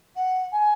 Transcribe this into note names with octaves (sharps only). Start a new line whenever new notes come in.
F#5
G#5